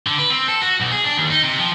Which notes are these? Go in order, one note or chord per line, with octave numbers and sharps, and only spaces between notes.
D3
B4
C4
A4
F#4
B1
G#4
D4
D#2
D#4
C3
F3